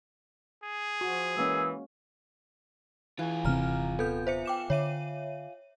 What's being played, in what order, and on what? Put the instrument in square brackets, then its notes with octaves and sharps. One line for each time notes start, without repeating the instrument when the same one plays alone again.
[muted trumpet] G#4
[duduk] F3 [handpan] F#4
[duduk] E3 [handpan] G#3 A#3 C#4 [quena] E6
[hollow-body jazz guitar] E3 [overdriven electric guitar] F4 G#4
[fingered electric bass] D#1 C3 C4 [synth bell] A#5 F6
[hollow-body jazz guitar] B3 [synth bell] A4 G6
[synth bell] C5 E5 C#7
G5 D6 E7
[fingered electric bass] D3 [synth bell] C#5 E5 D#7